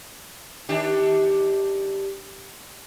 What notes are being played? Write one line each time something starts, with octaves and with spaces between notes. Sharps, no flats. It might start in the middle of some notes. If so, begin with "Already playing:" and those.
D#3 D4 G4